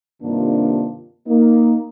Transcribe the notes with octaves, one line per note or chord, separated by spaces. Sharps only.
G2 C3 D#3 A#3 D4 F4
A#3 D#4